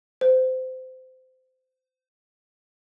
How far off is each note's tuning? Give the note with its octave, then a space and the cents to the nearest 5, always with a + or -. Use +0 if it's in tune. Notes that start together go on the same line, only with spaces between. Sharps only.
C5 -20